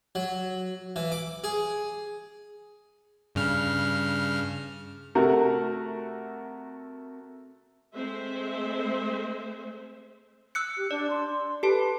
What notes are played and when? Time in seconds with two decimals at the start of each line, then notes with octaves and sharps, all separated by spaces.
0.15 F#3
0.96 E3
1.12 D6
1.44 G#4
3.35 G2 C#3 F6
5.15 C3 A3 F#4 A#4
7.95 G#3 A3 C4 C5 E5
10.55 E6 F#6 C#7
10.77 G4
10.91 D4 D5
11.10 C6
11.63 G4 A4 B4 A5